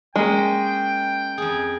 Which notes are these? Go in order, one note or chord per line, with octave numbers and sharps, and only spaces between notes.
G#3 A#3 C#4 G5
F2 G#4